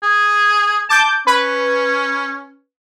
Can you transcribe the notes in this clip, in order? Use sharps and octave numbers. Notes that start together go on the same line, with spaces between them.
G#4
A5 D6 G6
C#4 B4